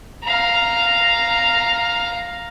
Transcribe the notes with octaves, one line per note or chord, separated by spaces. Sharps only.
F5 A#5